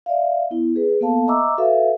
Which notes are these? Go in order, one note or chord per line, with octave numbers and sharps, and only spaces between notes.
D5 E5 F5
B3 E4
G#4 B4
A#3 B3 A4 F5 A5
D#5 E5 A#5 C#6 D6 E6
F#4 A4 B4 E5 F5